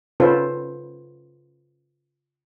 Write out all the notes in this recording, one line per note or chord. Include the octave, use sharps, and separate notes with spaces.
C#3 C#4 F4 A4 B4 C5